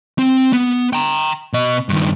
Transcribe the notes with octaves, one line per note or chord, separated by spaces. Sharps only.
C4
B3
G5 A#5
B2 D#5
G2 D#3